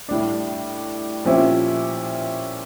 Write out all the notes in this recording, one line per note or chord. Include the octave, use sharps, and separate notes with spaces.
A2 G3 D4
A#2 F3 C#4 E4 G4